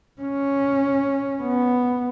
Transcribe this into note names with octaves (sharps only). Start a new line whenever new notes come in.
C#4
B3